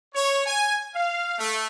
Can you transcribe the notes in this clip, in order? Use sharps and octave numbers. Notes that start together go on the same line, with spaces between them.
C#5
G#5
F5
A3